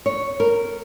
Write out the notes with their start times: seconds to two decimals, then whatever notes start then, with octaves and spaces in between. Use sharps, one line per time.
0.06 C#5
0.40 A#4